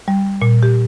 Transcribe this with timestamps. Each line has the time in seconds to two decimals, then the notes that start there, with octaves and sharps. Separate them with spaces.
0.08 G3
0.42 A#2
0.63 G4